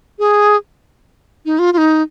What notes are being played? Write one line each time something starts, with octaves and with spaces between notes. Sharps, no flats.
G#4
D#4
F4
F4
D#4